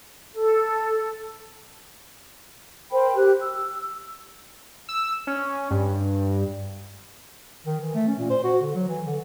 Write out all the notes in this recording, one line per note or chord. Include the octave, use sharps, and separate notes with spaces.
A4
A#4 C5 G5 B5
G4 F#6
E6
E6
C#4
G2
D#3
E3
A3
C#4
A#2
C5
F#4
D3
F#3
E3
D3